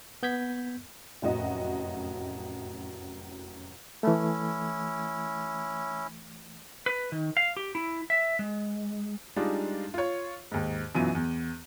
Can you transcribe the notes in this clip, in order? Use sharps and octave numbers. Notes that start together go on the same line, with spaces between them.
B3 G6 G#6 B6
F1 F#2 A2 F#4 D#5
E3 A3 C#4 E4
B4
D#3
F5
G4
E4
E5
G#3
G3 G#3 D4 D#4 F4
F4 C#5
D#2 G#2
F#2 B2 E3 F#3 F4 D#7
E2